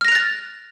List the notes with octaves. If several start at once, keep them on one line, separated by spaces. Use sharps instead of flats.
F6 F#6 A6 A#6 F7